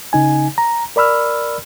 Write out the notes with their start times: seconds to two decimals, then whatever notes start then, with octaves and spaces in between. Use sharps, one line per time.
0.13 C#3 D#4 G#5
0.58 A#5
0.96 A#4 D5 B5 E6 F6